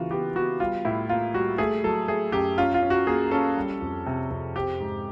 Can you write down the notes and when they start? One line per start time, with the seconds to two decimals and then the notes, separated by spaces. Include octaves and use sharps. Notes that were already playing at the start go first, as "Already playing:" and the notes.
Already playing: C#3 E3 A#3 F4 F#4
0.11 B3 G4
0.35 B3 F#4
0.60 G3 F4
0.85 A2 E4
1.09 A#3 F4
1.34 G3 F#4
1.58 A3 G#4
1.84 F#3 A4
2.08 A3 G#4
2.32 F#2 G4
2.58 C#4 F4
2.74 F4
2.83 C#4
2.90 F#4
3.07 A#3 G#4
3.31 C#4 A4
3.57 G3
3.81 F2
4.06 C3
4.31 F2
4.56 C4 G4
4.80 G#2